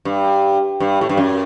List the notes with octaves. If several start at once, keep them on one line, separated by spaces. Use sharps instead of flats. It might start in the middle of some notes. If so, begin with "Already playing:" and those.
G2
G2
A2
G2
F#2